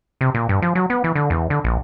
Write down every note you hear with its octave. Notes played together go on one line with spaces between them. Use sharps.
C3
A#2
G2
F3
F#3
B3
E3
D3
E2
D3
A#1